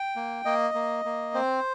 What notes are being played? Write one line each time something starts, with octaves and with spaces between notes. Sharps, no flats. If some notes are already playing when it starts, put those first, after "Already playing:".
Already playing: G5
A#3
A#3 D#5
A#3
A#3
C4 C5